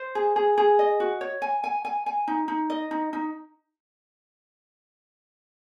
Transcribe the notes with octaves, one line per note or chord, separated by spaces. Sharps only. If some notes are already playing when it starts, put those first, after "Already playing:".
Already playing: C5
G#4
G#4
G#4
D#5
F#4
C#5
G#5
G#5
G#5
G#5
D#4
D#4
D#5
D#4
D#4